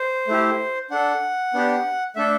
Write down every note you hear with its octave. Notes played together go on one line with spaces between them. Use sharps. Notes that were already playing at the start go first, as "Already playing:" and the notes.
Already playing: C5
A3 E4 G4
D4 A4 F#5
B3 D4 G4
A3 D4 A4 E5